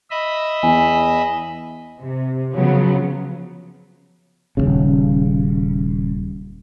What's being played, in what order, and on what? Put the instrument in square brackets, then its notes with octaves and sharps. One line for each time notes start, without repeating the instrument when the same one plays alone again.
[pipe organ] D#5 E5 B5
[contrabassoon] E2 [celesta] G#5
[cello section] C3
C#3 F3 F#3 B3
[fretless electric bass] D#1 A#1 C#3